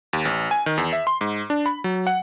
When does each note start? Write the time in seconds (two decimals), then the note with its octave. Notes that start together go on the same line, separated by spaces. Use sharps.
0.13 D#2
0.25 A1
0.51 G#5
0.66 D#3
0.78 E2
0.93 E5
1.07 C6
1.21 G#2
1.50 D4
1.66 B5
1.84 F#3
2.07 F#5